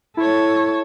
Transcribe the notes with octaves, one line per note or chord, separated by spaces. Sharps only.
E4 A4 C#5